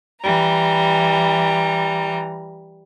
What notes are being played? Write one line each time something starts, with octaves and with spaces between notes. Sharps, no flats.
E3 G3 A#5